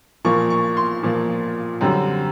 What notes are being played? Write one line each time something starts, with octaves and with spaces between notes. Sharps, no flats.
A#2 F3 A#3 C#6
C#6
C6
A#2 F3 A#3
F#2 D3 G3 C4